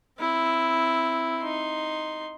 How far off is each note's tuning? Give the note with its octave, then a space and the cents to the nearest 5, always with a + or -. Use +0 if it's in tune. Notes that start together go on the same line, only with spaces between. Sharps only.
C4 +0 E4 +0
D#4 +0 C6 +0